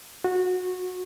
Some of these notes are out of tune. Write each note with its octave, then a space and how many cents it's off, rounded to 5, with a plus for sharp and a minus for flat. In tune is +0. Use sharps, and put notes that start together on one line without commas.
F#4 -20